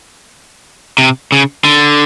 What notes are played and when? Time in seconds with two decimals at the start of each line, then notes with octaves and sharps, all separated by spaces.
0.98 C3
1.32 C#3
1.64 D3